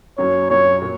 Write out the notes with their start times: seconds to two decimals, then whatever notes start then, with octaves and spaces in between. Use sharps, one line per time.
0.18 F#2 F#3 C#4 C#5
0.50 F#2 F#3 C#4 C#5
0.81 A#2 F#3 A#3